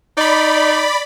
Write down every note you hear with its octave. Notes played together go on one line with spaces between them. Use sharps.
D#4 D5 B5